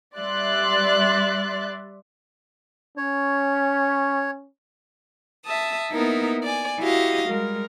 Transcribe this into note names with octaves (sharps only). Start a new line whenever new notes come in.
G3 D5 E5 C6 F#6 A6
C#4 C#5
E5 A5 D#6
A#3 B3 D#4 E4 A#4 E5
D5 G#5
E4 F#4 G4 D#5 F5
G3 G#3 A#4